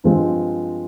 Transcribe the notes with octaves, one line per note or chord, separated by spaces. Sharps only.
G2 F3 G#3 C4